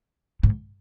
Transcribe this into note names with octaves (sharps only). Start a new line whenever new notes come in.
G#2